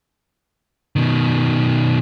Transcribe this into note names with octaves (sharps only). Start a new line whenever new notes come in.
B2 D#3